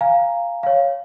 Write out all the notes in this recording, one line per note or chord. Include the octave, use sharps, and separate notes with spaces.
F5 G#5 A#5
C#5 F5